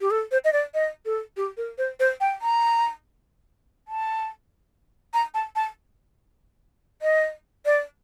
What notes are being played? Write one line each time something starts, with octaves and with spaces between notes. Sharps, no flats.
G4
A4
C5
D#5
D5
D#5
A4
G4
A#4
C5
C5
G5
A#5
A5
A#5
A5
A5
D#5
D5